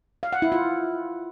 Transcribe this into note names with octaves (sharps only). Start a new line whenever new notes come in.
F5
F#5
E4
F4